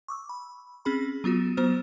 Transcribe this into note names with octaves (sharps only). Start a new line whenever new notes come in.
C#6 D6 E6
B5
C4 C#4 G#4 B5
F#3 B3 F4 F#4
F#3 B3 F#4 C5 F6